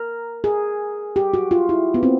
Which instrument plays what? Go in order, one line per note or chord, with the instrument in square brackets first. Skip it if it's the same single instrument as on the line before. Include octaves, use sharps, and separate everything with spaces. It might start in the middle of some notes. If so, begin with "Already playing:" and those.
Already playing: [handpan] A#4
G#4
G4
F#4
F4
E4
B3
C4